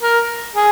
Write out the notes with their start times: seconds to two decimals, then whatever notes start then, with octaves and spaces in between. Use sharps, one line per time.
0.02 A#4
0.56 G#4